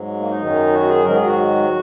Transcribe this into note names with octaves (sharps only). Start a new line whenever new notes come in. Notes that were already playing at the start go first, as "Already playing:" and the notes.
Already playing: G#2 F#3
A#3
D#4
F#2 D#3 F#3
F#4
G#4
G#2 D#3 F#3 A#4
G#4
F#4